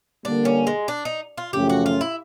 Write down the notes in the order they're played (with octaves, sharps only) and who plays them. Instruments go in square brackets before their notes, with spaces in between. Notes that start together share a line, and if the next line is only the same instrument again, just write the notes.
[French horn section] D3 G3 A#3 [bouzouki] D4
[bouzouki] C#4
G#3
D4
D#4
F4
[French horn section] F#2 C#3 F3 A3 C#4 [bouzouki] G4
[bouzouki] F#4
F4
E4